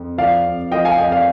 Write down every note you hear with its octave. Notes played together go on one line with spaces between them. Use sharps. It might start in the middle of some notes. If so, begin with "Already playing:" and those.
Already playing: F2
F3 D5 F5
F2
F3 D#5 G5
F5 G#5
F2 D#5 G5
D5 F5